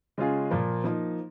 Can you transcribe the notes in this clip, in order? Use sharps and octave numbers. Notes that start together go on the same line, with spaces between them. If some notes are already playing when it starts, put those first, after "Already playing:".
C#3 G#3 C#4 F4 G#4
A#2 F3 A#3
F3 A#3 D#4